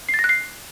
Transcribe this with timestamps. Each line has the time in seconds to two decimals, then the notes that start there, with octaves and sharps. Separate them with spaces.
0.09 C7
0.14 A6
0.19 A#6
0.24 F#6
0.29 C7